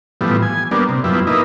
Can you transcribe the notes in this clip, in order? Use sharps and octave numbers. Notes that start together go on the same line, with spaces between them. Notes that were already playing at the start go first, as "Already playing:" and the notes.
A2 E3 F3 G3 B3
G#5
G3 A#3 B3 D4
C3
F#2 F3 G3 B3 E4
A#3 D#4 E4 B4